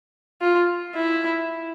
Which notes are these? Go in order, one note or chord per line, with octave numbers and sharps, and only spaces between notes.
F4
E4